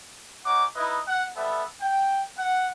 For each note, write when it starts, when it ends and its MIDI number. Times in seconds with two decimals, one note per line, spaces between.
0.45 0.65 61
0.45 0.65 63
0.45 0.65 78
0.45 0.65 86
0.76 0.99 63
0.76 0.99 64
0.76 0.99 71
0.76 0.99 75
1.07 1.25 78
1.36 1.63 55
1.36 1.63 59
1.36 1.63 69
1.36 1.63 76
1.81 2.22 79
2.38 2.68 78